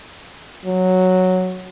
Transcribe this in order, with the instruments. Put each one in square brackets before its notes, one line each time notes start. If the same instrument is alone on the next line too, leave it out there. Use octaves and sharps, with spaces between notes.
[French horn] F#3